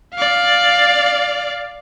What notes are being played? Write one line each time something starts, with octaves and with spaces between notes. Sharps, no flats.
D5 F5